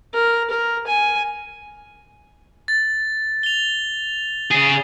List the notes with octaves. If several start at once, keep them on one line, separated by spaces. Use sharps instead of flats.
A#4
A#4
G#5
A6
F7 G7
C#3 G#4